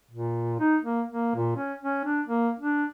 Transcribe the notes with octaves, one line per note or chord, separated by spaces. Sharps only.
A#2
D#4
A#3
A#3
A#2
C#4
C#4
D4
A#3
D4